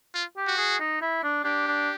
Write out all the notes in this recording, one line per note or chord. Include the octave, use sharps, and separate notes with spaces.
F4
G4
F#4
G#4
D#4
E4
D4
D4 G4
D4